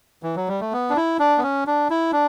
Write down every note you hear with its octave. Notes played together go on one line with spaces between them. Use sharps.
E3
F#3
G3
A3
B3
D4
E4
D4
B3
C#4
D4
E4
D4